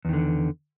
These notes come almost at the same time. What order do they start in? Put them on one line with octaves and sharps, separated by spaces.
E2 D#3 D3